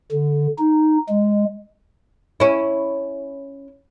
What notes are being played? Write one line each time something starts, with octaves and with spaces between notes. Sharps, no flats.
D3
D#4
G#3
C#4 E4